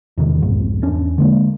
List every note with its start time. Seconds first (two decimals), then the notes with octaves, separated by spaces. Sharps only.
0.18 E2 C3 D#3
0.42 C2 F2 G#2
0.82 E2 C#4 D4
1.18 D3 G#3 A#3